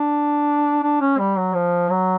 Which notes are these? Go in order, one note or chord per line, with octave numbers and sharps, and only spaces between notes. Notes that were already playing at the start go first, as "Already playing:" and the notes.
Already playing: D4
D4
C#4
G3
F#3
F3
F#3